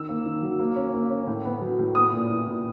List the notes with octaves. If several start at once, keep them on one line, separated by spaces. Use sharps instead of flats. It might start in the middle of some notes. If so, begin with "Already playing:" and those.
Already playing: D#3 E6
A#3
D#3
F#3
A#3
C#4
A#3
C#4
A2
B3
F#3
A2
B3 D#6
A#2
E4
A#2